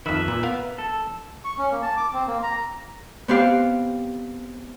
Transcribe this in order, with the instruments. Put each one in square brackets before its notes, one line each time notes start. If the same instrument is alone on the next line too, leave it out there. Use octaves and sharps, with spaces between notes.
[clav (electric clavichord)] F2 D#3 [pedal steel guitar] B4 E5
[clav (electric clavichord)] A#2
B3 A#4 F5
[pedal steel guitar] A4
[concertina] C#6
C#4
A#3
A5
D6
C4
A#3
A#5
[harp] B3 C4 G4 F5